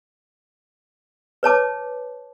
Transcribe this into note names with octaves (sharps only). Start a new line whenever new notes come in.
B4 C#5 A5 D6